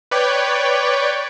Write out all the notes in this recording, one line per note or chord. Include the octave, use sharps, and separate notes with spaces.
B4 C#5 D5 G5